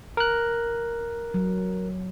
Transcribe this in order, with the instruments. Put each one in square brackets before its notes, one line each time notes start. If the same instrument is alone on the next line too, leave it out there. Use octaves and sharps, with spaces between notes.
[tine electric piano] A#4 F#6
[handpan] F#3